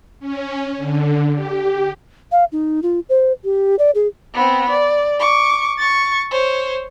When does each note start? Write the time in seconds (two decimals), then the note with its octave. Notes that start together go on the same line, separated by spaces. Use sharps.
0.20 C#4
0.77 D3
1.34 G4
2.32 F5
2.52 D#4
2.83 F4
3.09 C5
3.44 G4
3.79 D5
3.95 G#4
4.34 B3 C4
4.69 D5
5.19 C#6 D6
5.78 C#6 A6
6.31 C5 C#5